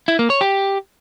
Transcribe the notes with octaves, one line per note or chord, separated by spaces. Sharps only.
E4
A#3
C#5
G4